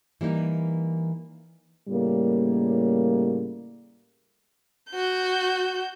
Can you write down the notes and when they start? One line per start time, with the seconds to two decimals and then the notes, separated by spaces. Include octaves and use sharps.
0.21 E3 G3 A#3 D#4
1.89 A2 C#3 G3 A#3
4.90 F#4 G6